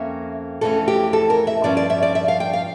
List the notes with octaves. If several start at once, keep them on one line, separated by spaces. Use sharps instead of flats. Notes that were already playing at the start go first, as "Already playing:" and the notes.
Already playing: F2 A#3 C#4 E5
F2 E3 A3 C#4 A4
G4
A4
A#4
E5
G2 F3 C#4 D5
D5
E5
D5
E5
F5
G5
F5